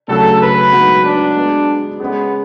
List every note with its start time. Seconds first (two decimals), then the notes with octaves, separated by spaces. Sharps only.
0.08 D2 C#3 F#3 A3 A4
0.41 B4
0.72 G#2 F#3 B3 F#4 A4
1.05 D4
1.36 G#3 B3 F#4 B4
1.99 G#3 B3 C#4 G#4